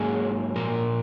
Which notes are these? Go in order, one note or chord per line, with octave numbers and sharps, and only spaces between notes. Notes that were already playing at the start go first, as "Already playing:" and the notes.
Already playing: G#2 F#3 A#3 G#4
A#2 F3 A#3 A#4